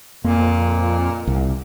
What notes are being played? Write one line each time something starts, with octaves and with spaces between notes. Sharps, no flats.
F2 A#2 A#3
C2